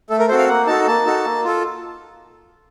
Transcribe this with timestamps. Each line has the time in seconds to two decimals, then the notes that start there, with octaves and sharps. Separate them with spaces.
0.10 A3 A4
0.19 A#4
0.28 C4 F#4 A4 C5
0.38 F5
0.49 A#3 F#5
0.67 D#4 F#4 A4 A5
0.87 A#3 A5
1.06 D#4 F#4 A4
1.24 A#3
1.44 F4 A4